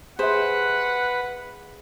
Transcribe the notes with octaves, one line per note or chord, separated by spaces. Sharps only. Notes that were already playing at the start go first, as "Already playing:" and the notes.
G#4 B4 C5 E5 F#5